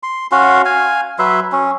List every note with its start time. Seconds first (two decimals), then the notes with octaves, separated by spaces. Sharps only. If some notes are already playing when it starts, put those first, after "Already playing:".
0.03 C6
0.32 C#4 F#4 F5 C6
0.65 F5 G#5
1.19 F#3 B4 E5 C6
1.52 C#4